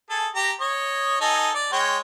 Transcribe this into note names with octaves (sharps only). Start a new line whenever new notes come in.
G#4 A4
G4 A#5
C#5 D#5
D#4 A4 G#5
D5
G#3 C#5 G5